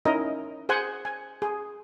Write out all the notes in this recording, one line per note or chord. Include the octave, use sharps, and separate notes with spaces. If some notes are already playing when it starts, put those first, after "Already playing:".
C#4 D#4 E4 A#4 D#5
G#4 C5 F#5 G#5
G#5
G#4